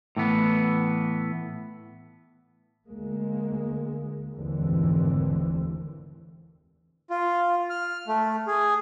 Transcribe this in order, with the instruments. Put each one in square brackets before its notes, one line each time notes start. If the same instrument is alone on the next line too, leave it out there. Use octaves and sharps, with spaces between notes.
[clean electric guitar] A2 E3 B3
[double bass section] D2 G#3 A#3
F1 D#2 G#2 D3 E3 C4
[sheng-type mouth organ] F4
F6
A3
G#4